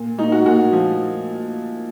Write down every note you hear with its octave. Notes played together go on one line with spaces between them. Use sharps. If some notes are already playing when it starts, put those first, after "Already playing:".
Already playing: A#2
A#2 D#4
F#4
A#2 F#4
F3